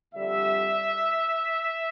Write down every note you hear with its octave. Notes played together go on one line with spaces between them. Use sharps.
F2 D3 G3 E5